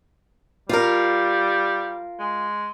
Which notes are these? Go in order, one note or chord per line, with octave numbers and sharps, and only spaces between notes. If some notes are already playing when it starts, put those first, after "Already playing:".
G3 F4 A#4
G#3